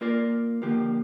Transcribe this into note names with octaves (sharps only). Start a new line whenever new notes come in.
A#3 F4 A#4 D5
D3 F3 A#3 G4